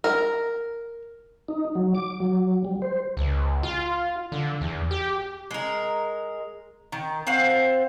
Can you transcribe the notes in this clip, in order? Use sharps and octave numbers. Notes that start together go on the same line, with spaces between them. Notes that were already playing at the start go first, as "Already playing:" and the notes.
A#4
D#4
F#3
D6
F#3
G3
C5
C#2
F4
D3
E2
G4
G#3 A#4
D#3
C4 C5 F5 F#5